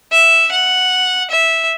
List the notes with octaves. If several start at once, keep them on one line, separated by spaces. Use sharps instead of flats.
E5
F#5
E5